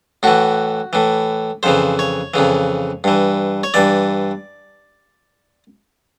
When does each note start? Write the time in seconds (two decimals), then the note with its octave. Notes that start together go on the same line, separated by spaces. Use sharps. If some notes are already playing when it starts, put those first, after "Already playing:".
0.23 A2 E3 F#4
0.93 A2 E3
1.63 F2 C#3 E3 C5
1.99 C#5
2.34 F2 C#3 E3
3.04 G2 E3
3.64 C#5
3.74 G2 E3 D5